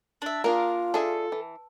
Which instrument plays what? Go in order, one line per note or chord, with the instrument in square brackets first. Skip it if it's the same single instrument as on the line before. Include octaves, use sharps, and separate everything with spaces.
[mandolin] D4 E5
[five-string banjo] A#3 D4 G#4 [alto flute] F4 [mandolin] A#4
[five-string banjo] D4 G#4 E5 [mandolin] A4
[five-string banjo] E3